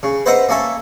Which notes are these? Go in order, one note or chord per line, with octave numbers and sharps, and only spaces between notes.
C#3
B4 C5 D#5 E5 F#5 A#5
A#3 C#4 A4 E5